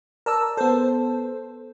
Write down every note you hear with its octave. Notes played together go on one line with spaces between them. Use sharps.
A#4 D5 A5 E6
B3 A4 C5